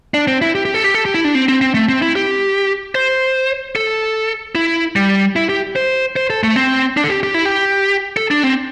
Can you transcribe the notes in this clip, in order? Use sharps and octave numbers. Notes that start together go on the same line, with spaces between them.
D4
C4
E4
G4
G4
A4
G4
A4
G4
E4
D4
C4
C4
C4
A3
C4
E4
G4
C5
A4
E4
G3
E4
G4
C5
C5
A4
A3
C4
D4
A4
G4
G4
E4
G4
A4
D4
C4